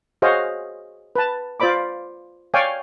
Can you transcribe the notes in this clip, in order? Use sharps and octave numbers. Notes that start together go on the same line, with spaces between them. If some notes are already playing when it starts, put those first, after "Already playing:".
F#4 G#4 C5 C#5 D#5 F5
B4 A5
F4 C5 D5 B5 D6
C#5 D5 F5 G5 G#5